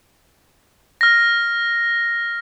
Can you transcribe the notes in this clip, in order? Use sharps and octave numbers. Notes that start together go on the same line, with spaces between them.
F6 A#6